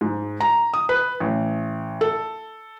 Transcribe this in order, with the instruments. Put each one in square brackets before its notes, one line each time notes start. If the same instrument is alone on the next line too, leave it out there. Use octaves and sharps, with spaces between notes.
[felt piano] G#2
A#5
D#6
B4
A1
A4